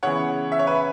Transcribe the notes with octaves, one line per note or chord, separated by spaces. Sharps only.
C#3 E3 B3 C#5 F#5
E5
C#5
B4 E5